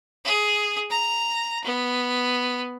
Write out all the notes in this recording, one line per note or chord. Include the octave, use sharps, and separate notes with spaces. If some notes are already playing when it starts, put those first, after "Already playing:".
G#4
A#5
B3